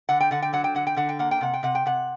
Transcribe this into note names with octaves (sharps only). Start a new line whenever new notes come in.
D3 F#5
G5
D3 F#5
G5
F#3 F#5
G5
D3 F#5
G5
D3 F#5
G5
A#3 F#5
G5
C3 F#5
G5
C3 F#5
G5
C3 F#5